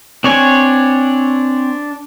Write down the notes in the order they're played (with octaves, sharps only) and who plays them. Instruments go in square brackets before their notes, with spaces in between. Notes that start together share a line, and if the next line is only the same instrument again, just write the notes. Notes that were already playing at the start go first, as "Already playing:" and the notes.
[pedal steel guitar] C4 C#5 G#5 [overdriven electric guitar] D4